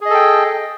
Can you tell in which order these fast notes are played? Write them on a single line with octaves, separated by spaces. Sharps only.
G#4 D#5 A4 G5